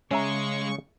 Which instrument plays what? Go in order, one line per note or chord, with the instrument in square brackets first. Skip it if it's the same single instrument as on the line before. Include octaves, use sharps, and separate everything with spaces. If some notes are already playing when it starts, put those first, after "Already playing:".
[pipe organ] C#3 C#6 [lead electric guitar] G#3 [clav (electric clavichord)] C#4 E5 A#5